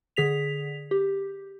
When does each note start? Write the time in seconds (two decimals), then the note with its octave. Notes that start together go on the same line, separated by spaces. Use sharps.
0.16 D3 G#4 B6 F7
0.91 G4